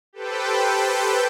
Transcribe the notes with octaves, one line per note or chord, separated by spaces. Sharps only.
G4 A4 B4 C5 G5